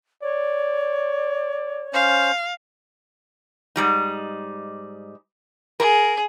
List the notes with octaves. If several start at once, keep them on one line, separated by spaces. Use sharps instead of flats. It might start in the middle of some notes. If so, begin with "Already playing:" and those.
C#5 D5
C#4 C5 F5
G#2 G3 D#4
G#4 A#4